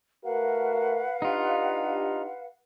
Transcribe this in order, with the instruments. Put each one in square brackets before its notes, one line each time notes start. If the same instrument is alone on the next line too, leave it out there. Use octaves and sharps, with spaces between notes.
[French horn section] A3 F#4 A#4 [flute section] B4 F5 F#5
[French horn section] D4 G4 [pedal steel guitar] D#4 F4